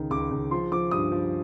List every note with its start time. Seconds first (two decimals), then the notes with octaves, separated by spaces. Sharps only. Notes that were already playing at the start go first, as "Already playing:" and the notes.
Already playing: C#2 D#3
0.10 C#2 D6
0.31 C#2
0.51 F3 C6
0.72 F3 D6
0.91 G2 D#6
1.12 F3